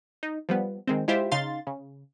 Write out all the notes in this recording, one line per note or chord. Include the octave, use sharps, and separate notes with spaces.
D#4
F3 G3 B3
D#3 G#3 C4
G#3 E4 F4 G4 C5 E5
C#3 D#4 F5 C6 A6
C#3